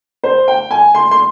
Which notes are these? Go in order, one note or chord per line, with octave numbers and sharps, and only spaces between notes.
C5
G5
G#5
C6
C6